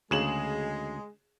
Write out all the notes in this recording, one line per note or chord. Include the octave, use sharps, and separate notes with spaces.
D2 C#3 G#3 G#4 E7 F#7